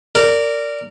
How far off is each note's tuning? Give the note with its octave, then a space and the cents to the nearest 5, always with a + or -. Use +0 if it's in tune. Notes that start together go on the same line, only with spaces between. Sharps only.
A#4 -20 D5 -10